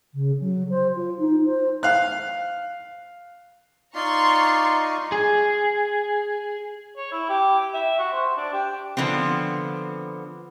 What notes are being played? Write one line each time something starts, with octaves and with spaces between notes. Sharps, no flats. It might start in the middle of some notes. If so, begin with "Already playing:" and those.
C#3
F#3
C5
F4
D#4
C5
F5 F#6
D#4 F4 D5 A#5 C6 C#6
G#4
C#5
E4
G4
E5
F#4
C5
D4
G4
D3 F3 B3 C4